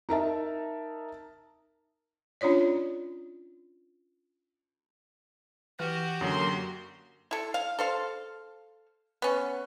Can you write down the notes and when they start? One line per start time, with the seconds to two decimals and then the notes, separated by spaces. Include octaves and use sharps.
0.09 D#4 A#4 E5 A5
2.41 C#4 D4 F4 C#5 D5
5.79 E3 F#4 G4 F6 A6
6.21 F#2 D3 F#3 A#3 C6 D#6
7.31 E4 A4
7.54 F5
7.79 A4 C5 F5
9.22 B3 C#4